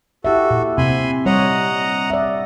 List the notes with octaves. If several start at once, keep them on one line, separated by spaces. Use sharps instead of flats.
E4 F#4 G4 A4 E5
A#2
C3 C4 G#5 B5 C6
G3 C#5 D#5 F#5 A#5
D5 E5